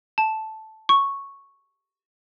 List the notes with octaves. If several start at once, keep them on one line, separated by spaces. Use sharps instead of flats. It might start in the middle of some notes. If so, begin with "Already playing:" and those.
A5
C#6